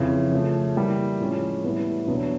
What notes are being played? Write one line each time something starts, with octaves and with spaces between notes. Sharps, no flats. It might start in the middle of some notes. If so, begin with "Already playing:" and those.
Already playing: F2 C#3 E3
C#3 F3 A3
E3 G3 A#3
A2 F3 G#3 C#4
A2 E3 G3 B3
E2 B2 F#3 B3 D4